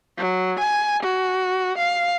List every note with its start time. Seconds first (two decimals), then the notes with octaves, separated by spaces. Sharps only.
0.18 F#3
0.59 G#5
1.03 F#4
1.78 F5